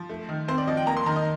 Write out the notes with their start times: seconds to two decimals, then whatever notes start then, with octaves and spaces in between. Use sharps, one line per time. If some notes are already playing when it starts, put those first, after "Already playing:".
Already playing: F3
0.10 A3
0.29 D#3
0.48 C4 C5
0.58 D5
0.67 F3 D#5
0.77 G5
0.87 A#3 A#5
0.97 C6
1.06 D#3 A#5
1.16 D#5